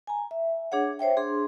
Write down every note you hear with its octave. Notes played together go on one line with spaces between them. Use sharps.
G#5 A#5
E5
D4 G#4 C#5 F#5
C5 C#5 E5 G5
D4 G#4 C6